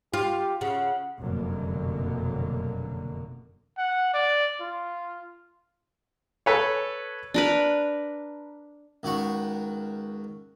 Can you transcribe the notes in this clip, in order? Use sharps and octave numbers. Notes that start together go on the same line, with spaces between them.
F4 G4
C#3 F#5
F1 F#2 B2 D3 F#3 A#3
F#5
D5
F4
A4 B4 C#5
D4 A#4 B4
C#2 D#3 F#4 B5 C#6